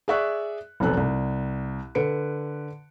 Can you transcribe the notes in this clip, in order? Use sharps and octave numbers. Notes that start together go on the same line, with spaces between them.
G#4 D5 E5 C#6 F#6
F1 B1 B3 C4 A4 F#6
C2
D3 B4 C#7 D7